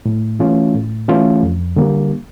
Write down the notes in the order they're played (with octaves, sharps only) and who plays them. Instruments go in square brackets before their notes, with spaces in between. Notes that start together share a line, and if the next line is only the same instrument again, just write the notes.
[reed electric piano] A2
E3 A3 C#4 F4
A2
E3 A3 C#4 F4
F2
D3 G3 A#3